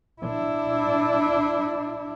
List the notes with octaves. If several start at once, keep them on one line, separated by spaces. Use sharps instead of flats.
D4 E4